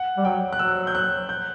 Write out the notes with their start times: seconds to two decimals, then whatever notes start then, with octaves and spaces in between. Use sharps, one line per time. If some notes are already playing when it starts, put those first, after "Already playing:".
Already playing: F#5
0.17 G3
0.25 F#3 G5
0.53 F#6
0.59 F#3 E6
0.87 G6
0.95 F#6
1.29 G6